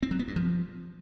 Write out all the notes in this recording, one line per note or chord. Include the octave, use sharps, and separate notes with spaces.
C4
F#3
B3
G2
F3